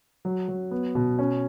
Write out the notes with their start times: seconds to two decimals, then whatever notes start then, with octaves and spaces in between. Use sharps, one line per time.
0.25 F#3
0.48 F#3
0.71 B3
0.95 B2
1.19 C#4